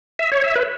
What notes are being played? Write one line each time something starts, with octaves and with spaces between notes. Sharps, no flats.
E5
C#5
E5
B4